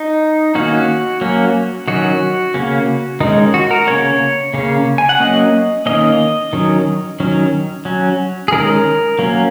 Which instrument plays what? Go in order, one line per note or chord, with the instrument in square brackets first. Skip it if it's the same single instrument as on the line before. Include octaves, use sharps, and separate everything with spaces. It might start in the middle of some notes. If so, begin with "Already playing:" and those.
Already playing: [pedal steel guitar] D#4
D#3 A#3 C#4 F#4
F#3 A#3 C#4
D#3 F#3 C#4 F#4
C#3 A#3 C#4
D#3 G#3 C#4 D#4
F#4
A#4
C#3 A#3 C#4 C#5
C#3 A#3 C#4
G#5
F#5
F#3 A#3 C#4 D#5
D#3 A#3 C#4 D#5
D#3 F#3 C#4
D#3 F#3 C#4
F#3 C#4
G#4
D#3 G#3 C#4 A#4
F#3 A#3 C#4